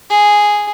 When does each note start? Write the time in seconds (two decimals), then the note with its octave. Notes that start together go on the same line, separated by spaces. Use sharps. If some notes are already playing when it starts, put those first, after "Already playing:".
0.10 G#4